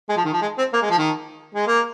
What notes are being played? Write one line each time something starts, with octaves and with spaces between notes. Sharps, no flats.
G#3
F3
D#3
F3
G#3
C4
A#3
G#3
F3
D#3
G#3
A#3